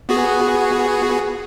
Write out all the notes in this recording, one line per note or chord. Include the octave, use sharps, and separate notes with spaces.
B3 F#4 G#4